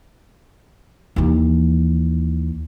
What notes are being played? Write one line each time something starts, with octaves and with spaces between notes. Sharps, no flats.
D#2 E3